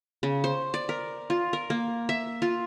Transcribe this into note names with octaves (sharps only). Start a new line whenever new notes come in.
C#3
C5
D5
A#4
F4
A#4
A#3
E5
F4